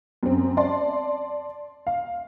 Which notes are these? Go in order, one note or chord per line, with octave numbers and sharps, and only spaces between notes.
F#2 C4
D5 A5 C6
F5